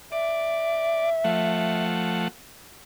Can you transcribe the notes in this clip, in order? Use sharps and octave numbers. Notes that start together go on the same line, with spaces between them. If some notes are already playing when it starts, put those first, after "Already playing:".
D5 E5
F3 A3 F#5